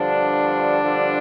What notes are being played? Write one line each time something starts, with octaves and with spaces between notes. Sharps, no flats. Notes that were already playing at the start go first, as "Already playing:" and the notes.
Already playing: G2 D3 F3 D4
G2 D3 F3